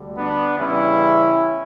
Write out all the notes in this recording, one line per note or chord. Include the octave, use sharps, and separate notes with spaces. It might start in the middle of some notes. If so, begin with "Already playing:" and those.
Already playing: D2 D3 G3
B3 D4
E2 C#3 E3 G3 C#4 E4